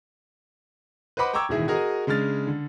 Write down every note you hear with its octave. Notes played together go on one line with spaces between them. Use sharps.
B4 C5 D#5 F#5 B5 D6
G5 A#5 C#6 D6 E6 G#6
E1 A2 D#3 E3 G#4 E5
F#4 G#4 A#4 D#5
C#3 G#3 D4 F6 A6
D3